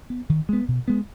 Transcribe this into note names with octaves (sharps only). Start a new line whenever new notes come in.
B3
D#3
G#3 B3
B2
G#3 B3